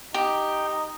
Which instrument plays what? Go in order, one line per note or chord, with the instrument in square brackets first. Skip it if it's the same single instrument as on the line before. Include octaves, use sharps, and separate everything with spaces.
[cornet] D#4 [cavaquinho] G4